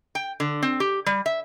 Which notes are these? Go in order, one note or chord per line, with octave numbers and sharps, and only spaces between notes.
G5
D3
C4
G4
G3
E5